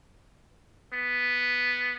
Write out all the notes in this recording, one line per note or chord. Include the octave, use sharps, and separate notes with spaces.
B3